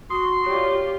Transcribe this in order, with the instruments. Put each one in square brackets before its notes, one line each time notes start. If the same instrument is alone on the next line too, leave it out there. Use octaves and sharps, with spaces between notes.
[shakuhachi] F#4 [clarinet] C6 [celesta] D#6 C7
[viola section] F4 G4 [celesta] C#5 D5